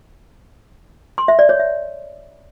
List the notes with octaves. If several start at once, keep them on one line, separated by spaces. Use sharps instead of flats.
C6
E5
D5
C#5
E5